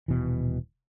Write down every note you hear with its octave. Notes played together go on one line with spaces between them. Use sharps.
D#1 B2 E3